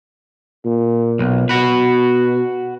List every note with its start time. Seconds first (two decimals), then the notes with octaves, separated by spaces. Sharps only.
0.65 A#2
1.19 B1
1.49 B2 F#4 B4